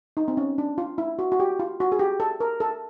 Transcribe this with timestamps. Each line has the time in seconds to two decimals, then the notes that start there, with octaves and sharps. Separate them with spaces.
0.17 D#4
0.28 C4
0.37 C#4
0.58 D4
0.78 F4
0.98 E4
1.19 F#4
1.32 F#4
1.40 G4
1.59 F4
1.80 F#4
1.92 G#4
1.99 G4
2.20 A4
2.40 A#4
2.60 A4